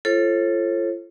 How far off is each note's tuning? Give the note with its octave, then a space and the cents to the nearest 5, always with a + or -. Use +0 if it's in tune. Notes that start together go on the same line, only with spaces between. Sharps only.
F4 -30 A4 +0 C#5 -45